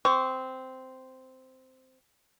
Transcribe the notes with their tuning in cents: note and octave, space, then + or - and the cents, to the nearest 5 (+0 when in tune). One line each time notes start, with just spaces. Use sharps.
C4 -10 C#6 +25